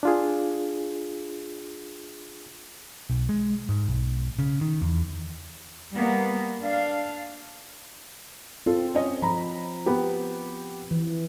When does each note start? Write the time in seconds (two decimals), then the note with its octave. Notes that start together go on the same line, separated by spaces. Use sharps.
0.03 D4 F4 G#4
3.10 B1
3.29 G#3
3.69 G#2
3.88 B1
4.39 C#3
4.61 D#3
4.82 E2
5.92 G3 A#3 B3
6.62 D4 F5
8.66 C4 F4 A4
8.95 C#4 C#5 D#5
9.22 F3 A#5 B5
9.86 B3 G4
10.91 E3